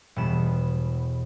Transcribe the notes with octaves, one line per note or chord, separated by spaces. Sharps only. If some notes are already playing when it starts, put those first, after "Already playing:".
E1 B2 G3 B3 E7